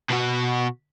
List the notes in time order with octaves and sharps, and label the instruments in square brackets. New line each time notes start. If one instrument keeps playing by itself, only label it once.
[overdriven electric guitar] B2 F#4